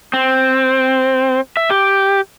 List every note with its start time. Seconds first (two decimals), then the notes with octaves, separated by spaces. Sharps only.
0.13 C4
1.57 E5
1.70 G4